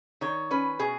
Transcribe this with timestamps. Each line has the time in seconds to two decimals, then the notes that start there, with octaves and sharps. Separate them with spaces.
0.21 D#3 C#5
0.51 C#4 B4
0.79 B2 G#4